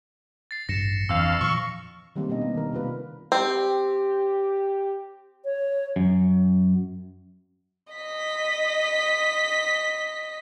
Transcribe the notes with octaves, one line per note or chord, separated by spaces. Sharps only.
A6 C7
A1 G2 A#6 C#7 E7
D1 F2 E3 D4 F5 E6
A#2 E3 F3 C#6
D#3 G3 A#3 C4
B2 A#3 B3 D4 D#5
A#3
D#3 A#4
C3 A#3 F4 B4
C4 G4
C#5
F#2
D#5 B6